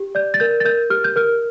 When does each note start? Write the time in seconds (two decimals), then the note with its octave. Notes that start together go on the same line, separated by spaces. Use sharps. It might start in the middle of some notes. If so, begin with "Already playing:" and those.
Already playing: G4
0.15 D5 G6
0.34 A6
0.40 A#4 G6
0.60 A6
0.65 A#4 G6
0.90 G4 F6
1.04 G6
1.16 A#4 F6